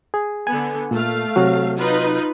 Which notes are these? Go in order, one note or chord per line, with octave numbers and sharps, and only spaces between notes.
G#4
D3 B3 G#5
A#2 A3 F5
C3 F#3 F#4
D#4 F4 B4